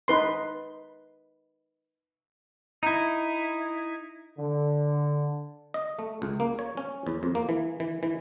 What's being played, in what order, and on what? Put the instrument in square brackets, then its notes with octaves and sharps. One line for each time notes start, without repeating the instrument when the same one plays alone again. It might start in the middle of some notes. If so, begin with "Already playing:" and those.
[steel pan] D#4 B4 C6
[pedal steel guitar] D#4 E4
[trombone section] D3
[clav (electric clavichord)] D#5
A3
C#2
A#3
C#5
C#4
E2
F2
A#3
E3
E3
E3